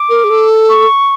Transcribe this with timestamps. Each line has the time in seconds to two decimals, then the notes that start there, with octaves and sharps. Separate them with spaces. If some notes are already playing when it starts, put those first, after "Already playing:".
Already playing: D6
0.10 A#4
0.24 G#4
0.30 A4
0.69 C#6